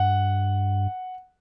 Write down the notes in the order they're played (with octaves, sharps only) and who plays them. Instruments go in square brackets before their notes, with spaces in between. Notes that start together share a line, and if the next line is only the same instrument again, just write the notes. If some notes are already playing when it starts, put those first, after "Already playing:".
Already playing: [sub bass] G2 [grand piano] F#5